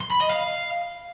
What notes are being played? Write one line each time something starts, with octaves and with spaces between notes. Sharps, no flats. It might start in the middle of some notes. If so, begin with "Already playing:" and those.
C6
B5
D#5
F5